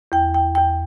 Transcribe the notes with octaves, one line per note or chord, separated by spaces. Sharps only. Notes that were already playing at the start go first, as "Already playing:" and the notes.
E2 G5
G5
E2 G5